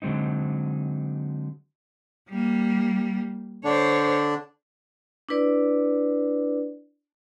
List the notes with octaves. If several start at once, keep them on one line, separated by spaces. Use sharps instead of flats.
D3 F#3 G#3 C4 D#4
G3 A#3
D3 D4 C5 C#5
D4 E4 B4 D5